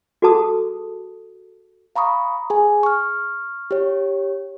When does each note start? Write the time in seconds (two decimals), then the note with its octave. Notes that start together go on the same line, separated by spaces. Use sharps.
0.22 F#4 G#4 A4 B4 A5 D#6
1.96 F5 A#5 B5 C#6 D#6
2.50 G#4 G#5
2.83 C#6 F6
3.71 G4 C#5